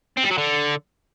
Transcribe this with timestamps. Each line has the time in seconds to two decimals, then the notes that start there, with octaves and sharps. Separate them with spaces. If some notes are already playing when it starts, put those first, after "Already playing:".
0.17 C4
0.24 G3
0.31 F#3
0.38 D3